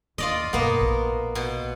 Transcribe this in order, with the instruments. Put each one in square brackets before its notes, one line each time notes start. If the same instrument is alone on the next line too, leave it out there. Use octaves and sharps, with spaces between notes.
[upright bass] D#2 [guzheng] F4 D5 D#5
[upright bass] G2 B2 [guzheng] A#3 B3
[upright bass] A#1
[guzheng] B2